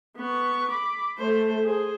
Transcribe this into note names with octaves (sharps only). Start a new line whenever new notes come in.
B3 C#6
B5 D6
A3 C5
G#4 C5